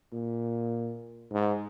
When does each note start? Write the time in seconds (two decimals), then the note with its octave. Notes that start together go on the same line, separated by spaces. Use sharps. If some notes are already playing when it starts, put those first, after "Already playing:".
0.12 A#2
1.32 G#2